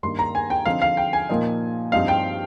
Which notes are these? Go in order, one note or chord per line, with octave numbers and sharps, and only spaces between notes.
G2 D#3 A#3 D#4 C6
A#5
G#5
G5
D3 F3 C4 D#4 F5
F5
G5
G#5
A#2 F3 A#3 D#4
G2 F3 C4 D#4 F5
G5